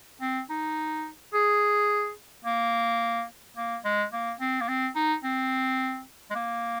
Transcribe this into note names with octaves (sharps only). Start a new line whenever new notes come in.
C4
D#4
G#4
A#3
A#3
G#3
A#3
C4
A#3
C4
D#4
C4
G#3
A#3